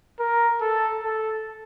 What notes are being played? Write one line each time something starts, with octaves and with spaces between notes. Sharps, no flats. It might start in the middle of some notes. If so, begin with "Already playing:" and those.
A#4
A4
A4